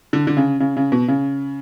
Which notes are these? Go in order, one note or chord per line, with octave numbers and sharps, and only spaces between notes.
D3
D3
C#3
C#3
C#3
B2
C#3